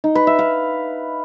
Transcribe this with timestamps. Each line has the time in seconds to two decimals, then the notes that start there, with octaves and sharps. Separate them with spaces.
0.04 D#4
0.15 B4
0.27 E5
0.39 F5